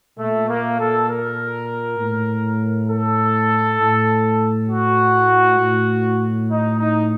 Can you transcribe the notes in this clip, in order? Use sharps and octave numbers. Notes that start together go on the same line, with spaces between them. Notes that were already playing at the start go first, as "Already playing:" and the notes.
A#2 A3
A#3
A4
A#4
A2
A4
A2
F#4
A2
D#4
D#4